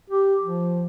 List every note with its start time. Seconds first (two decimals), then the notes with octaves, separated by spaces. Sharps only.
0.10 G4
0.42 F3